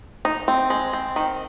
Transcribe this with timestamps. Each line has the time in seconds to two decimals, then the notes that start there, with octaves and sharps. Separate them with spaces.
0.25 D#4
0.48 C4
0.70 G#3
0.93 C4
1.16 D#3